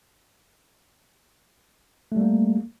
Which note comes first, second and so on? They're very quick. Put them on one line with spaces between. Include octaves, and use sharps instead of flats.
A3 G3 A#3